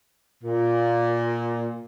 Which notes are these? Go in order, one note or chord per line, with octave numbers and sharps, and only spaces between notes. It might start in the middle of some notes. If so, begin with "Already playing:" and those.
A#2